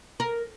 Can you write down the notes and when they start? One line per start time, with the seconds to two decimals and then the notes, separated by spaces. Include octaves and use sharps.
0.20 A#4